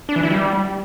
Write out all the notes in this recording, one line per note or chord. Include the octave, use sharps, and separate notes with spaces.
D4
E3
E4
G3